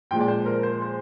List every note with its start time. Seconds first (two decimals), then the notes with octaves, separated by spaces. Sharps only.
0.11 A#2 F3 G#3 G5
0.20 D5
0.28 C5
0.46 A#4
0.63 C5
0.82 C5